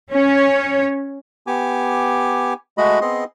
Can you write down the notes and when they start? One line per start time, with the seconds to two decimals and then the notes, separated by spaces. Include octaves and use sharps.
0.12 C#4 C#5
1.47 B3 G4 G#5 D6
2.78 G#3 A3 F#4 D#5 B5
3.01 B3 C4 G#4 D#5 C6